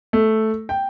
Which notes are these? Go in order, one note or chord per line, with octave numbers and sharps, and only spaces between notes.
A3
G5